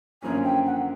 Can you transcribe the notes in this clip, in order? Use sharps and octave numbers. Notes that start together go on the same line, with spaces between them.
F#2 D3 F3 A#3 C#4 G#5
G5
F#5